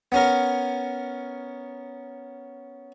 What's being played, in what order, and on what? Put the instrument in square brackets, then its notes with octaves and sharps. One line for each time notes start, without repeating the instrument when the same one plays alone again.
[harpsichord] B3 C#4 A#4